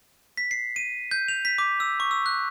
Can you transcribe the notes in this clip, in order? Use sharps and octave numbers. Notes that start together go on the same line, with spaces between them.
B6
C7
D#7
G6
F7
B6
D6
E6
C#6
E6
F#6